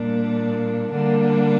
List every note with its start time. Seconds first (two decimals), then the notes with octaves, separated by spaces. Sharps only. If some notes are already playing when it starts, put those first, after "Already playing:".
Already playing: A#2 G3 A#3 D4
0.89 D3 G3 A#3 D4